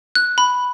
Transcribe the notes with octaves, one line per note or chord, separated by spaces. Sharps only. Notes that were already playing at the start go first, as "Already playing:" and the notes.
F#6
B5